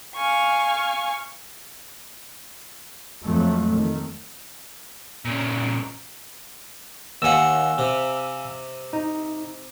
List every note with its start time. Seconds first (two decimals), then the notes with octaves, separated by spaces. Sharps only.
0.15 F5 G#5 C#6
3.24 F2 F3 F#3 G#3 A3
3.74 D#3 A3
5.25 A#2 C#3
7.22 D#2 F5 F#5 G#5 E6
7.78 C3
8.93 D#4